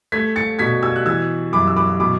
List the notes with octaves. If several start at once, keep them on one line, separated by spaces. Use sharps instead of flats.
A3 G#6 B6
A6 C#7
B2 G#6 B6
E6 G#6
F#6
E3 E6 G#6
F#2 B5 D6
E6
B5 D6
B2 B5 D6